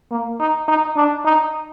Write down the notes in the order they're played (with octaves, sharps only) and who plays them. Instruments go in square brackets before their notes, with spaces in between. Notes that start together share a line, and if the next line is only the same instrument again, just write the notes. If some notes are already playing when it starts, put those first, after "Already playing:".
[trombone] A#3
D#4
D#4
D4
D#4